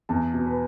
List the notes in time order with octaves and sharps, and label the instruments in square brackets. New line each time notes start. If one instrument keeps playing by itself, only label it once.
[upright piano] E2 A5
B2
B4